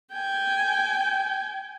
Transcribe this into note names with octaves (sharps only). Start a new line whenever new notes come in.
G5 G#5